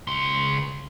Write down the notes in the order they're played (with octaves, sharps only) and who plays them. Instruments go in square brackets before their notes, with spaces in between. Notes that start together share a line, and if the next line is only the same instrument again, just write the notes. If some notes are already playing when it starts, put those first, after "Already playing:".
[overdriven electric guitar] C#2 C6